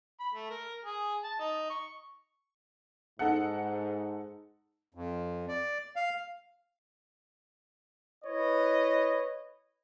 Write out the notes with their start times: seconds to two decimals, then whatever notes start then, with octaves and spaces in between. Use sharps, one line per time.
0.20 B5
0.34 A3
0.51 A#4
0.84 G#4
1.24 A5
1.40 D#4
1.70 C#6
3.19 G#2 D#4 A4 F#5
4.94 F2
5.48 D5
5.96 F5
8.25 E4 B4 C#5 D#5